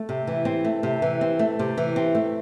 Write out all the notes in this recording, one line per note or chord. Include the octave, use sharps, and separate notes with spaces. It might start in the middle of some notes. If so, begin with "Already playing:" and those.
Already playing: A3
C3
E3
C4
A3
C3
E3
C4
A3
C3
E3
C4
A3